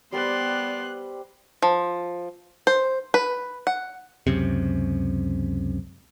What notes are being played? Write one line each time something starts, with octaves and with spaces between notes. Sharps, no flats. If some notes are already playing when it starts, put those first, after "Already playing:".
G3 B3 B4 C5 D5 C6 F#6
F3
C5
B4
F#5
C#2 F#2 C3